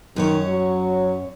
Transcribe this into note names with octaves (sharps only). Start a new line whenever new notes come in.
F#2 D#3 C#4 C#5
F#3